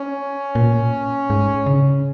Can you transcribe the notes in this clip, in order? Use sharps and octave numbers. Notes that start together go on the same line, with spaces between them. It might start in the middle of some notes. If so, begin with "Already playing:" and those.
Already playing: C#4
A#2
G#2
C#3